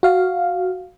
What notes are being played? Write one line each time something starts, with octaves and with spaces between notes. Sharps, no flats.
F#4 F5